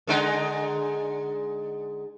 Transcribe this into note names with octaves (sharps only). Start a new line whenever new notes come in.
D3 G#3 D#4